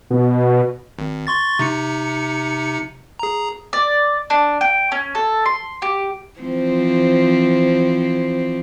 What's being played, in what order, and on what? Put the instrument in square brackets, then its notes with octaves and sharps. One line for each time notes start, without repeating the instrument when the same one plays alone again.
[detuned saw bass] B2
[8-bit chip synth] G#1
C6 C#6 A6
C3 D#4 C#7
G#4 A#5
[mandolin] D5
D4
G5
C#4
A4
C6
G4
[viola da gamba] E3 F3 C4